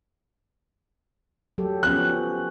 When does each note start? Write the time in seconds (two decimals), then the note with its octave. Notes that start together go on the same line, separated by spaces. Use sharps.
1.58 F#3 G4 A4
1.83 F3 B3 C#4 F#6